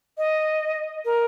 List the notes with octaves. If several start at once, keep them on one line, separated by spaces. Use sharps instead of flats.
D#5
A#4